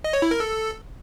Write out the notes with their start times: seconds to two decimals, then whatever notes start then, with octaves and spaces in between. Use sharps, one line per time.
0.04 D#5
0.13 C#5
0.22 E4
0.31 A#4
0.40 A4